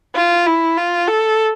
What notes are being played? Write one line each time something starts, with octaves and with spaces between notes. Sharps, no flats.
F4
E4
F4
A4